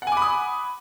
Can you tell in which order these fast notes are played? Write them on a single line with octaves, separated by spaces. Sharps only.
F#5 G#5 D6 B5 D#6